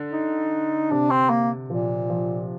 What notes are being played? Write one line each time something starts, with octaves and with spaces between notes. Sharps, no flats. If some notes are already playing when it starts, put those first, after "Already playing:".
Already playing: D3
D#4
C3 D4
C4
A#3
A#2 F3
F3